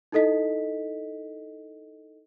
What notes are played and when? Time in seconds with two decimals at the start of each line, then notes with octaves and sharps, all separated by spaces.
0.12 D#4 E4 A4 D#5 B6